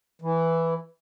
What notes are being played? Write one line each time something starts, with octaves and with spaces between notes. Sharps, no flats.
E3